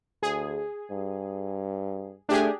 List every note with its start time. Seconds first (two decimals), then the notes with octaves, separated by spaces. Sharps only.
0.23 D2 G#4
0.90 G2
2.29 A3 D4 G4 G#4